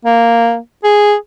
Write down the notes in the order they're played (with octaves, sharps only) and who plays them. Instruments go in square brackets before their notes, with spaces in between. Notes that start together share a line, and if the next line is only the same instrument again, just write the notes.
[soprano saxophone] A#3
G#4